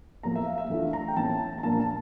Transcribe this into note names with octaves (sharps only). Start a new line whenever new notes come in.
A2 F3 A#3 A#5
E5
F5
E5
E3 A3 D4 F4
A#5
G5
A2 E3 A#3 C#4 E4 A5
A#5
A#2 F3 A#3 D4 A5
A5